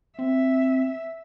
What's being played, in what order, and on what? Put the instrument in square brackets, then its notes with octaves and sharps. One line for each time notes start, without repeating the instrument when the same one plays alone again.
[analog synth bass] C4 [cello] E5